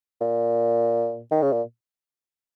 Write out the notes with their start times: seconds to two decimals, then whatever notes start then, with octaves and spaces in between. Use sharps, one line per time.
0.21 A#2
1.32 D#3
1.42 C#3
1.52 A#2